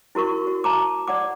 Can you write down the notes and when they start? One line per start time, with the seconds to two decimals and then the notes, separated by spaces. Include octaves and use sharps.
0.15 E4 F#4 A#4 C#6
0.47 F#4
0.64 A5 A#5 D6
1.07 D5 F#5 D6